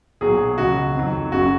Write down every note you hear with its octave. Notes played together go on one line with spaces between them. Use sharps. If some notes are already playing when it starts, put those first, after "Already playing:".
B1 A#2 F#3 G#4
C#2 C#3 F#3 F#4
F2 D#3 F#3
F#1 F#2 C#3 F#3 F#4